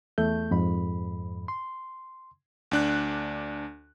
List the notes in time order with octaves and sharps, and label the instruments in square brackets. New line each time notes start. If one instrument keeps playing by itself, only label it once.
[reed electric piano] E2 A3 G6
F2 G#2 B5
C6
[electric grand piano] D2 D4 F#6